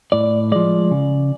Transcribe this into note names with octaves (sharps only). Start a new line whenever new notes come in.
A2 D5
F3 G#3 D5
C#3